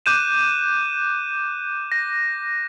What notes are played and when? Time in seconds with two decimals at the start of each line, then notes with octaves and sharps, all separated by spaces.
0.06 D6 F#6 G6 D#7 E7
1.92 A#6